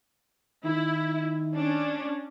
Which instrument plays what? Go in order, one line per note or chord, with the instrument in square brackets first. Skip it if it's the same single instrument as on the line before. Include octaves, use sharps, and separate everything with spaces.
[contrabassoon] D#3 [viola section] E4
[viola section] C#4 D4